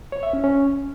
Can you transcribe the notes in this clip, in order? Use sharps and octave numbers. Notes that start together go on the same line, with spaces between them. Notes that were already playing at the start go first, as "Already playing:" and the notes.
C#5
E5
C#4
C#4